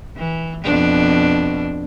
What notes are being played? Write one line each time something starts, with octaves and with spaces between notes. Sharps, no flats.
E3
F2 B2 D4